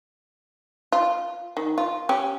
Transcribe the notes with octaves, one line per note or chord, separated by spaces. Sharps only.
F4
D#3
F4
C#4 G4